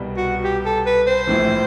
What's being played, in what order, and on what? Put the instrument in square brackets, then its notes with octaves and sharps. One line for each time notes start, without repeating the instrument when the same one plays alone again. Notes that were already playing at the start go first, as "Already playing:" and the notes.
Already playing: [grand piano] C2 B2 G3
[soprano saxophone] F#4
G4
A4
B4
C5
[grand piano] A#1 A2 E3